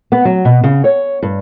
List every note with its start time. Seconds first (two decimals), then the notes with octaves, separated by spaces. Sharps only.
0.12 B3
0.25 F#3
0.45 B2
0.64 C#3
0.84 C#5
1.23 G2